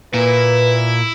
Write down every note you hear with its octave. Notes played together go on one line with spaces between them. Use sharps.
A#2 E4 B4